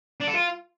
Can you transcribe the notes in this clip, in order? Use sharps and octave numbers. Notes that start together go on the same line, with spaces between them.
D4
A4
F4